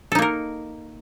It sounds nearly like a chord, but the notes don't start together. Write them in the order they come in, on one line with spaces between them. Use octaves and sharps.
A4 D#4 A#3 A#4